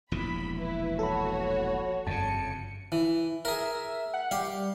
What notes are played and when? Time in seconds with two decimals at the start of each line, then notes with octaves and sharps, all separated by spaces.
0.12 E1 A#1 E3 B5
0.57 E4 B4
0.99 F#4 A4 C#5 B5
2.07 G1 F2 C#3 A5 C#7
2.92 E3
3.45 G#4 A#4 E5
4.14 F#5
4.31 G3 G4 F5